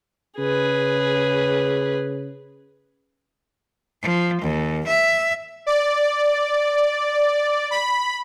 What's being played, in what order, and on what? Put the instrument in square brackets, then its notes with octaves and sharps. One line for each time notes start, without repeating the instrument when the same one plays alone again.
[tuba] C#3 [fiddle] G#4 B4
[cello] F3
D#2
E5
[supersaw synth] D5
B5